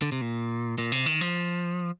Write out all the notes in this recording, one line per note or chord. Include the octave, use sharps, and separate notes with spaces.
D3
C3
A#2
A#2
C3
D#3
F3